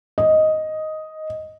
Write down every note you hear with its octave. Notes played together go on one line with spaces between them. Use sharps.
D#5